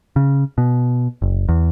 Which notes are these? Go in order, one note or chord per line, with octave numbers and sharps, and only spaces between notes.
C#3
B2
F#1
E2